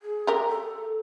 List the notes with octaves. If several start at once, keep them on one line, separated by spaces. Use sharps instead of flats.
G#4
G4 A#4
A4